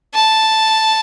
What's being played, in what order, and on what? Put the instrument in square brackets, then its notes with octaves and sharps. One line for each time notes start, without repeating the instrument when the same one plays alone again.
[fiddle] A5